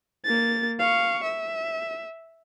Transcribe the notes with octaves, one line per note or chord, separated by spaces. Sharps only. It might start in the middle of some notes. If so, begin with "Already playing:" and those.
A#3 A6
F5 C#6
E5